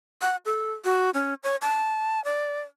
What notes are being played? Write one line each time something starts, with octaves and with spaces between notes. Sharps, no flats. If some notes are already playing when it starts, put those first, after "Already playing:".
F#5
A4
F#4
C#4
C#5
A5
D5